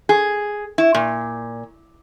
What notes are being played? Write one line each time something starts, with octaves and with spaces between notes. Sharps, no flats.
G#4
E4
A#2